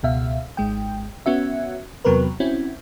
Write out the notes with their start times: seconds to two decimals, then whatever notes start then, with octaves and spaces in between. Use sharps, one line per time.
0.03 C#2 B2 E5 F5
0.57 G#1 G#3 G5
1.26 B3 C#4 F#4 E5
2.05 E2 C3 F#3 B3 A#4 B4
2.40 C4 C#4 E4 F#4